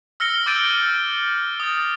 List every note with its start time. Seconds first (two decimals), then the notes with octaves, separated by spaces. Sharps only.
0.20 E6 F6 A#6 C#7 G7
0.46 D6 E6 G6 A6 D7 D#7
1.60 D#6 A6